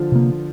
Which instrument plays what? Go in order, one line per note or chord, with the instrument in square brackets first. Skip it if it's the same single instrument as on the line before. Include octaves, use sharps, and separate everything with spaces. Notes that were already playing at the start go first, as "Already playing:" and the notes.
Already playing: [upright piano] D3 F3 F4
[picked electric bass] C3 A#3